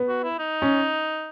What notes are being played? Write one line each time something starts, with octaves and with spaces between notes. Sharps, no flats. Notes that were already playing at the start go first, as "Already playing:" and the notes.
Already playing: B3
F#4
E4
D#4
C#4